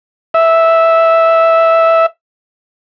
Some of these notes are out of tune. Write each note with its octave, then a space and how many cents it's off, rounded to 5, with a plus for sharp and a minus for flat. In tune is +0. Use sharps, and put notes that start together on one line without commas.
E5 -5